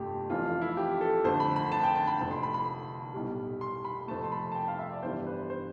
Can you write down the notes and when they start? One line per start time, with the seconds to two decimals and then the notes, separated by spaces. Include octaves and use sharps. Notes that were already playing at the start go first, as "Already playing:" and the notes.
Already playing: G1 F2 C3 F3 A3 G4
0.30 F1 F2 E3 F4
0.45 F4
0.62 E4
0.77 G4
1.01 A4
1.24 F2 D3 A3 C5
1.40 B5
1.56 B5
1.72 A5
1.83 G5
1.95 A5
2.07 B5
2.19 F1 F2 C3 B5
2.31 C6
2.43 B5
2.54 B5
3.14 B1 A2 G3
3.61 C6
3.85 B5
4.08 F2 C3 F3 A3 A5
4.24 C6
4.32 B5
4.52 A5
4.55 G5
4.68 F5
4.79 E5
4.91 D5
5.03 G1 G2 E3 G3 C5
5.26 B4
5.50 C5